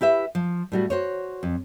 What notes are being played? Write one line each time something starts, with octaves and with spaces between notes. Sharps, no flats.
E4 G4 B4 E5
F3
A2 G3 F#4
F#4 C5 C#5
F2